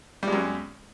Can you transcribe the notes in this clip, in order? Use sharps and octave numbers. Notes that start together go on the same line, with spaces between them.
F#2 G3 G#3